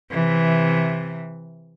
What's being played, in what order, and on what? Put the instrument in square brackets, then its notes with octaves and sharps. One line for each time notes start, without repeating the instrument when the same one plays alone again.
[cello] C3 E3